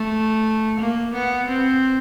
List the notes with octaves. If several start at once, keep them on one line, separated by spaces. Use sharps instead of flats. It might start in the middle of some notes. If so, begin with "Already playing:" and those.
Already playing: A3
A#3
B3
C4